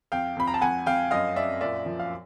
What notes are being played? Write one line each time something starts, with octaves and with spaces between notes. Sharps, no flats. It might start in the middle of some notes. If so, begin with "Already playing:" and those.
F2 F5 G5
F2 B5
A#5
A5
F2 F#5 G#5
F2 F5 G5
F#2 D#5 F5
F#2 D5 E5
A#2 D5 E5
F3
F5